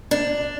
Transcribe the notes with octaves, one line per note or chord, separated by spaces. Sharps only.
D4